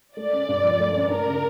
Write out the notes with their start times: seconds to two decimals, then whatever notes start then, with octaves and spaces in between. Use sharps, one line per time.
0.17 A3 D5
0.33 C#4
0.48 G2
0.64 F3
0.80 A3
0.95 C#4
1.10 D4 A#4
1.26 C#3